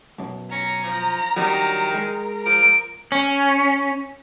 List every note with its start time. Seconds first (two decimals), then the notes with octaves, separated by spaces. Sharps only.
0.18 B1 F#2
0.51 C#4 A#5
0.84 F3
1.36 D#3 F#3 G3 D4
1.94 G#3 A#4
2.46 F3 D7
3.12 C#4